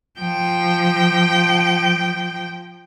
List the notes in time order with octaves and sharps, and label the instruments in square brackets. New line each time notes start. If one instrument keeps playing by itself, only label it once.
[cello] F3 G5